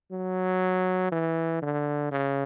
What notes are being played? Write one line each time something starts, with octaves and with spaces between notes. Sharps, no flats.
F#3
E3
D3
C#3